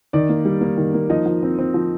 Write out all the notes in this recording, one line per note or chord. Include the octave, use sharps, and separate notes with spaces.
D#3 D5
A#3
G3
A#3
D#3
A#3
F3 D#4 D#5
F3
C4
C4
F3